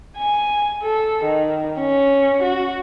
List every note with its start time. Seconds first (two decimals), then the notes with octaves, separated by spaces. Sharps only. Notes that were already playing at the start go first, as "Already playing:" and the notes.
0.17 G#5
0.83 A4
1.24 D#3
1.78 C#4
2.42 F#4